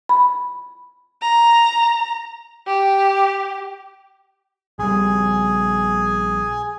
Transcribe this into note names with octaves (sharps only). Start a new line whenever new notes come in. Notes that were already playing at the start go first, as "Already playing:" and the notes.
B5
A#5
G4
A#1 G3 G#4